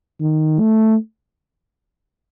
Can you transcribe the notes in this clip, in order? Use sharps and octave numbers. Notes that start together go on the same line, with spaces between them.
D#3
A3